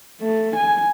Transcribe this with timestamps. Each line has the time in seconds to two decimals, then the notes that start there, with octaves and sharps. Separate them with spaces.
0.21 A3
0.56 G#5